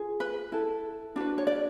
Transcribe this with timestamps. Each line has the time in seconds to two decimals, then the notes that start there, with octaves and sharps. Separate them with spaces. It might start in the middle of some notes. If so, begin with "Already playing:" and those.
Already playing: F4 G#4
0.20 B4
0.52 E4 A4
1.16 D4 F#4 B4
1.38 C#5
1.47 D5